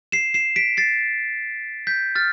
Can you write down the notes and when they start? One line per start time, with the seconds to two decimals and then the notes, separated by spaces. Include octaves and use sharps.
0.12 C7 E7
0.34 C7 E7
0.56 B6 D7
0.77 A6 C7
1.87 G6 B6
2.15 F6 A6